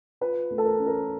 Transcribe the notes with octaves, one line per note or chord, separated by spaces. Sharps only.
F4 B4
A3
A4
A#4
C#4
A#4